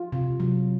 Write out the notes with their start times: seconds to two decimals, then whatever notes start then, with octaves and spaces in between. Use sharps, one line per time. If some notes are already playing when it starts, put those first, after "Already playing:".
Already playing: F4
0.12 C3
0.40 F#3